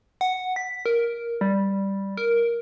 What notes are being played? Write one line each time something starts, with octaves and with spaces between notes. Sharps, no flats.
F#5
B6
A#4
G3
A#4